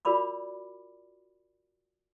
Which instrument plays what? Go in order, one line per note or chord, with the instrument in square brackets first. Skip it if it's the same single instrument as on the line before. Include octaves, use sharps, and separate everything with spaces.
[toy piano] F4 F#4 A#4 D5 B5 D6